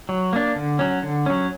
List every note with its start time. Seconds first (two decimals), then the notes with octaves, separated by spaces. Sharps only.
0.09 F#3
0.33 A#3 D4
0.56 D3
0.79 F#3 C#4
1.03 D3
1.26 F#3 C#4